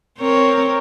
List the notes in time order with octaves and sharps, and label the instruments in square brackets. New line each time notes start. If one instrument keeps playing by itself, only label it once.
[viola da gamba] C4 A#4 C#5